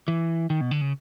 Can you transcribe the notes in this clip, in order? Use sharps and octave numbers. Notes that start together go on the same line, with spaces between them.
E3
D#3
B2
D3
C#3